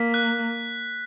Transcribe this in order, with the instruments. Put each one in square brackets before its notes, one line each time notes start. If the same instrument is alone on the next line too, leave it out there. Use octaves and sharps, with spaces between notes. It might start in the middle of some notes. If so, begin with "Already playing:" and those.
Already playing: [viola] A#3 [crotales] B6
[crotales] F#6